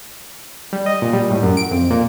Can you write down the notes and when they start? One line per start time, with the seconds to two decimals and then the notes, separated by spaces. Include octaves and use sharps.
0.73 G3
0.86 D#5
1.02 A#2
1.13 G3
1.31 A2
1.43 F#2
1.57 D7
1.71 F2
1.91 A#2